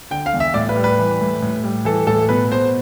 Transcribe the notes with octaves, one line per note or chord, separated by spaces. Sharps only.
D3 G5
F5
E2
E5
A2 D5
B4
G3
B4
E3
A2
A2
G3
E3 A4
A2 A4
B2 B4
B2 C5